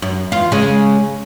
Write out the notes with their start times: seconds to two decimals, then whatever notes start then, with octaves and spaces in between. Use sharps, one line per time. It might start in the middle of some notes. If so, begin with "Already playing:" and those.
0.02 F#2
0.32 E2 F4
0.52 C#3 G#3